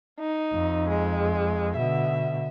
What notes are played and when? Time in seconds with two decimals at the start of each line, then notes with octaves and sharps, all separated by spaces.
0.20 D#4
0.53 F2
0.89 G#3
1.77 B2 D3 E5